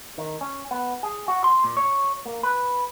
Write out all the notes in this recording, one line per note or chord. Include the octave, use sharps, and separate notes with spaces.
D#3
C#4
B3
G#4
F#4
C6
A#2
C#5
A#3
B4